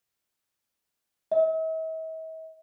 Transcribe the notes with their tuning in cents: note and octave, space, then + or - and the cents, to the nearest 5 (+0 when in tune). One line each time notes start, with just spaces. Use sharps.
E5 -45